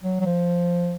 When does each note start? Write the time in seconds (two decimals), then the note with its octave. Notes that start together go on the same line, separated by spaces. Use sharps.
0.03 F#3
0.20 F#3
0.26 F3